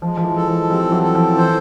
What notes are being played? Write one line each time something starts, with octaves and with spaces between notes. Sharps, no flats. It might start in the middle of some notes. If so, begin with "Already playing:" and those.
F3 G#3
F3
E3
A4
F3
F3 G3 C4
E3 F#3
A4
F3
E3 C5